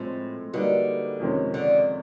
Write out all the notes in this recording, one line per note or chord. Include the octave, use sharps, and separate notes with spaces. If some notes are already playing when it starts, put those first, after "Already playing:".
Already playing: A2 F3 G#3 C4
D3 G3 A#3 D#4 F#4 B4
F2 C3 D#3 G#3 C#4
D3